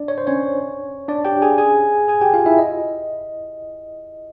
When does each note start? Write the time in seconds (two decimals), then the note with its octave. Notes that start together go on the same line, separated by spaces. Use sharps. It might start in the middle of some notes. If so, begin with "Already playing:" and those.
Already playing: D4 D5
0.08 C#5
0.18 C5
0.27 C#4 C#5
1.08 D4 D5
1.25 G4 G5
1.42 G#4 G#5
1.58 G#4 G#5
2.08 G#4 G#5
2.21 G4 G5
2.34 F4 F5
2.46 E4 E5
2.58 D#5